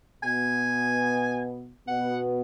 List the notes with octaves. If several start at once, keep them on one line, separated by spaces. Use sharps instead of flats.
B2 B3 G#5
B2 B3 F#5